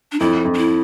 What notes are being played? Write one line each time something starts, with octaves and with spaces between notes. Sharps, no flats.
D4
F2 E4
F2
D4
E4